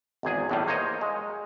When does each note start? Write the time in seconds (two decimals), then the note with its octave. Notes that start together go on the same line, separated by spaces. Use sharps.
0.23 G#1 E2 G#4
0.49 E2 A2 G3
0.68 A#3 C5 C#5 D#5
1.01 G#3